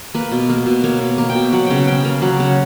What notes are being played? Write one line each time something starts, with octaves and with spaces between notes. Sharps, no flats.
A#3 B4
B2
A#3
B2
A#3 C#5
B2
A#3
G5
B2
F#3 F#5
C#3 F#5 G5
C#3 G5
A#3
F#3 F#5
C#3 F#5